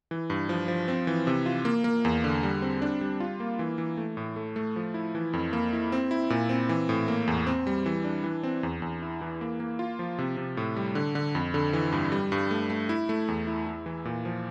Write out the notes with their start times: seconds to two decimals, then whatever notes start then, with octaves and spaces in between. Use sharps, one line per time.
0.11 E3
0.30 G2
0.49 F3
0.68 F3
0.88 C4
1.07 E3
1.27 C3
1.46 F4
1.65 A#3
1.84 A#3
2.05 E2
2.24 D3
2.43 G3
2.62 C4
2.82 D4
3.01 G3
3.20 F4
3.40 A#3
3.59 E3
3.78 E3
3.97 A3
4.17 A2
4.36 A3
4.56 A3
4.76 F3
4.94 E4
5.15 E3
5.33 F2
5.53 A#3
5.73 E4
5.92 C4
6.11 E4
6.30 A#2
6.49 C4
6.69 E3
6.89 A2
7.08 A#3
7.28 E2
7.47 C4
7.67 G3
7.86 E3
8.04 D4
8.24 E3
8.43 C4
8.63 E2
8.82 E2
9.02 E4
9.21 E3
9.41 A#3
9.60 A#3
9.79 F4
9.99 F3
10.18 C3
10.37 C3
10.57 A2
10.77 G3
10.95 D3
11.15 D3
11.35 F2
11.54 D3
11.73 E3
11.92 G2
12.12 G3
12.32 G2
12.51 A3
12.70 A3
12.89 E4
13.09 A3
13.28 E2
13.47 E4
13.67 E4
13.86 E3
14.05 A#2
14.25 F3